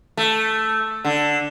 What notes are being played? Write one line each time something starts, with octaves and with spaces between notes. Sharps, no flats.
A3
D3